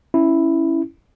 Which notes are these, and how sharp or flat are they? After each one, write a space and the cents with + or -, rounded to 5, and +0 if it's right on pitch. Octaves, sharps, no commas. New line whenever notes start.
C#4 +0 E4 +0